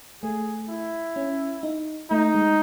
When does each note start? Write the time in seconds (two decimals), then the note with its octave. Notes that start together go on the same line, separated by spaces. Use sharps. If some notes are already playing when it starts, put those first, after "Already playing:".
0.23 A3 G#4
0.69 E4
1.16 C#4
1.63 D#4
2.11 A3 D#4
2.35 G#3